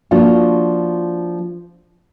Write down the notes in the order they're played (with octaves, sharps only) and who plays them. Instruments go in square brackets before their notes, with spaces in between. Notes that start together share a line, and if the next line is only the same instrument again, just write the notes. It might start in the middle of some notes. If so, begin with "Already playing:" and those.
[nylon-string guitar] F3 A#3 D4 F4 F#4